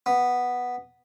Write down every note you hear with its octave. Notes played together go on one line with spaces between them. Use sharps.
B3